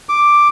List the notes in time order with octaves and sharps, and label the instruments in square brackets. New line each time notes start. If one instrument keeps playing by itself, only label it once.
[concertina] D6